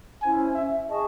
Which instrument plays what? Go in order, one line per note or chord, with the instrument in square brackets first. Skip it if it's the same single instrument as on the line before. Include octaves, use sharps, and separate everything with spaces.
[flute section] C#4 E4 C5 [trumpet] G#5
[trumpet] E5
[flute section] G#4 D#5 A5 C#6